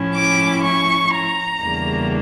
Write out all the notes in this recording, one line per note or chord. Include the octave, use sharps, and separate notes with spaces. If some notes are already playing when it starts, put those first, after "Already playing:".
Already playing: A2 F3 C#4 E4
D6
C#6
A#5
E2 C#3 G3 A#3 D4